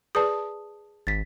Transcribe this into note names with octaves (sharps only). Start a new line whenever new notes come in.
G#4 B4 D5 A5 D#6
G#1 A6 B6